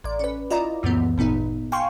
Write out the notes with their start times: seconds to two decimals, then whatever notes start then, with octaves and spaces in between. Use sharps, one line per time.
0.04 A1 D5
0.19 C#4 B4
0.50 E4 F4 D5 D#5 A#5
0.83 C#2 F#2 A#2 E3 B3
1.18 G#1 A#2 B3 D#4
1.72 F5 G5 G#5 C6 C#6